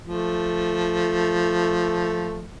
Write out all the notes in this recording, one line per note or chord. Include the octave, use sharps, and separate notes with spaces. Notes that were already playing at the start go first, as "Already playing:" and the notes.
F3 A3